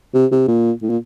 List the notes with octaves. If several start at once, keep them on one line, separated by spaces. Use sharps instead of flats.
C3
C3
A#2
A2
A#2